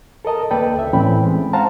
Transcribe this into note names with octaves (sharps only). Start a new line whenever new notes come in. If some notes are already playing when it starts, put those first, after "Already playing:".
A4 A#4 D#5 A5
D2 A#3 A4 B4 D5 G5
C#2 E5
A2 E3 C4 C#4 G5 B5
G#3
C5 F5 F#5 A5 A#5